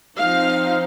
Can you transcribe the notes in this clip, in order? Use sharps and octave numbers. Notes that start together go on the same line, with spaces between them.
F3 C4 D#4 F5